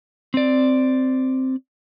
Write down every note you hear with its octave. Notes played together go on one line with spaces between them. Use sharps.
C4 D5